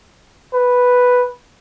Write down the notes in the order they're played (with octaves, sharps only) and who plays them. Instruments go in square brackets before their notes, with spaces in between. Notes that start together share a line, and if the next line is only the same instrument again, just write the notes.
[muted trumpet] B4